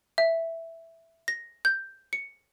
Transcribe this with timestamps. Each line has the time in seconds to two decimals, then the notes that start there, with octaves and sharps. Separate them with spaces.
0.18 E5
1.28 A#6
1.65 G6
2.13 C#7